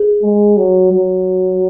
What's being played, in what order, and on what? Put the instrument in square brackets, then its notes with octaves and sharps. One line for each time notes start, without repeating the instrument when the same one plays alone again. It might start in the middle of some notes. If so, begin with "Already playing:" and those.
Already playing: [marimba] G#4
[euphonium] G#3
F#3
F#3